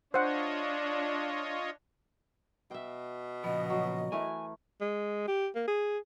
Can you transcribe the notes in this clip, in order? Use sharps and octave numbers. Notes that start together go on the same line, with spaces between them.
D4 F4 C5 C#5 D#5 F#5
B2 E5 G5
A#2 C#3 F3 B3 D#5
F#3
E3 A3 A#4 G#5
G#3
G4
A#3
G#4